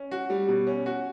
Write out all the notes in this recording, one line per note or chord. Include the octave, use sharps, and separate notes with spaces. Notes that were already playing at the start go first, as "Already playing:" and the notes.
Already playing: C#4
F#4
G3
B2
C#4
F#4